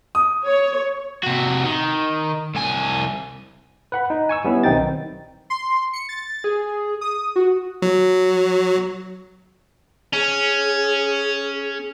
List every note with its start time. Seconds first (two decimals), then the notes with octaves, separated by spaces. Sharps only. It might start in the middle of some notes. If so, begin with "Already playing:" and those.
0.15 D#6
0.46 C#5
1.23 C3 F#4
1.63 D#3
2.55 C2 G#5
3.92 B4 F#5 B5
4.10 D#4
4.29 G#5 C#6 E6
4.44 G3 B3 C#4 E4
4.64 B1 D#3 C4 D#4 G5 A6
5.50 C6
5.93 C#7
6.09 A6
6.44 G#4
7.01 D#6
7.36 F#4
7.82 F#3
10.13 C#4 G#4